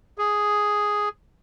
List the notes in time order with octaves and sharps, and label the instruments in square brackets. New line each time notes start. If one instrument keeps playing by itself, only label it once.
[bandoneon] G#4